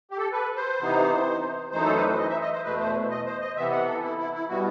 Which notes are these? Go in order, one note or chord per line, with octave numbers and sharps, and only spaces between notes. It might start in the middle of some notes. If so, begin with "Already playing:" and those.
G4
A4
B4
C5
C3 E3 B3 D#4
F#2 E3 A3 D#4 C5
A4
B4
C5
D#5
E5
D#5
C5
E2 B2 A3 B4
C5
D#5
C5
D#5
C3 E3 B3 E5
F#5
A4
E4
E4
E4
B2 G3 B3 F#4